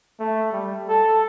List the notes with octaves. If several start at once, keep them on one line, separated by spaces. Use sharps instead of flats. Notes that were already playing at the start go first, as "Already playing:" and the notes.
A3
G3
A4